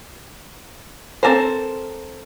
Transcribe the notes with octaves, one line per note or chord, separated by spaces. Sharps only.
C4 C#4 A4 A#4 C5